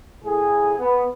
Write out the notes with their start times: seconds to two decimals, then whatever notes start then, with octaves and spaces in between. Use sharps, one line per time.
0.24 A2 G#4
0.78 B3